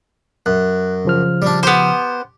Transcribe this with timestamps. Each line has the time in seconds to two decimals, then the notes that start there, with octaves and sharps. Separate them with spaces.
0.46 F#2 F#6
1.05 C#3 F3 F6
1.42 G3 D4
1.63 B3 G4 C5